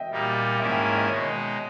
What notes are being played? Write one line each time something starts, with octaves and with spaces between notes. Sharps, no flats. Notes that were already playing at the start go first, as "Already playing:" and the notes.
Already playing: D#5 E5 G5
A#2 G3 A#3 D#4
G#2 D#3 A#3 C#4 E4 E5
G5
E5
D#5
B2 G#3 D#4 C#5